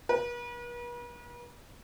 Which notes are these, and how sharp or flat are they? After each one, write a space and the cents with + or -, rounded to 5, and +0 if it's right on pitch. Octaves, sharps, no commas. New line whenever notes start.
B4 -45